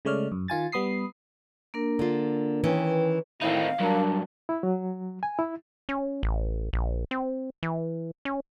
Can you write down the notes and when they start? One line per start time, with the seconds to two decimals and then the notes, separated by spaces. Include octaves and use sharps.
0.05 C#3 G#3 A3 C#5 D5 F6
0.32 F#2
0.48 D#3 F4 G#5 A6
0.72 G3 B3 B5 D#6 C7
1.74 A#3 D4 A#4
1.99 D3 F4
2.64 D#3 E3 C#4 B4 G5
3.41 A2 D#3 C4 D#4 E4 F5
3.80 G2 F#3 D4 A#4
4.49 E4
4.63 F#3
5.23 G#5
5.39 E4
5.89 C#4
6.23 A1
6.73 A#1
7.11 C4
7.63 E3
8.25 C#4